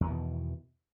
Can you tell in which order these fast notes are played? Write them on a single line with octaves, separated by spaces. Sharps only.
E2 E3 D#3 B2